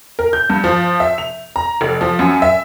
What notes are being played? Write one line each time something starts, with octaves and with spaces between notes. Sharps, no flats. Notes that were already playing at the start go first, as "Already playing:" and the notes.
A#4
G6
G2
F3
E5
F7
A#5
F1
F3
F#2
E5